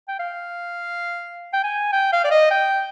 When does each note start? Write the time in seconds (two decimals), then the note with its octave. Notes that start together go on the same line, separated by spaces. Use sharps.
0.08 G5
0.19 F5
1.53 G5
1.64 G#5
1.92 G5
2.13 F5
2.24 D5
2.31 D#5
2.51 G5